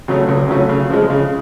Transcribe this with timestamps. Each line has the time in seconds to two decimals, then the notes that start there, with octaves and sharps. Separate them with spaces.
0.08 C#3 F#3 A3 C#4
0.28 C#2
0.48 C#3 F#3 A3 C#4
0.69 C#3
0.90 F3 G#3
1.10 C#3